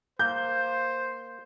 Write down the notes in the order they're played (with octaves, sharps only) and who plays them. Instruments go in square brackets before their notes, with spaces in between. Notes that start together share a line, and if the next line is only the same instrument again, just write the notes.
[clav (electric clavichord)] A#3 [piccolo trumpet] C5 [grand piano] G6